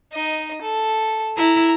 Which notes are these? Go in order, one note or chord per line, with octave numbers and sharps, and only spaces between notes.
D#4 D#5
A4
E4 A#5